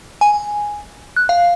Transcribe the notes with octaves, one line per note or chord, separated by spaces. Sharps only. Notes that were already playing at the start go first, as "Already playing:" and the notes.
G#5
F#6
F5